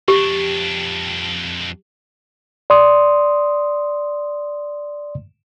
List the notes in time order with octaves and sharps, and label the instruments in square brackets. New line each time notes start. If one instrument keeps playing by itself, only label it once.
[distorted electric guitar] F2 D4 [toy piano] G4
[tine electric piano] D5 C6 D#6